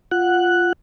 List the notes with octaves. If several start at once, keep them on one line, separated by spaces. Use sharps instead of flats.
F4 F#5 F#6